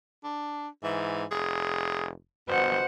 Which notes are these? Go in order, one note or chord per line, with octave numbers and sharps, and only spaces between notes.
D4
G#2 E3
F1 G#4
G1 B2 C5 F#5